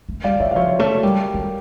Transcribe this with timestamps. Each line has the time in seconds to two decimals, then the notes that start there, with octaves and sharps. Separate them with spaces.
0.09 A3
0.24 G3 D5 F5
0.40 A3 C#5 E5
0.51 F5
0.56 F3 C#5 E5
0.79 A3 A4 C#5
1.03 G3 G4 A#4
1.34 G3